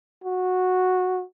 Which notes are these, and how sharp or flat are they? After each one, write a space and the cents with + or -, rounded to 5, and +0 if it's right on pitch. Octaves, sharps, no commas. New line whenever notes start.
F#4 -10